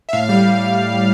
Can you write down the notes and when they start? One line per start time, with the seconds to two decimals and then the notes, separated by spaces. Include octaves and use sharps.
0.09 E5
0.13 A2 F5
0.29 G3 F5